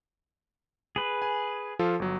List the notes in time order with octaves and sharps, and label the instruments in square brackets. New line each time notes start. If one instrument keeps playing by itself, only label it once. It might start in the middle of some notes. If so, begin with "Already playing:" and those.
[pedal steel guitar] G#4 B4
[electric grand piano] G#5
F3 F4 A4
G1 F#3